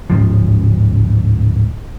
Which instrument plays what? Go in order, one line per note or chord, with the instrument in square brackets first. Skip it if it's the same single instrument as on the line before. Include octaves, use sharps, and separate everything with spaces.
[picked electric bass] D1 G#2 F3